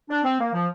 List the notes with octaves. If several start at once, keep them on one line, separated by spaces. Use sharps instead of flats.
D4
C4
A#3
F3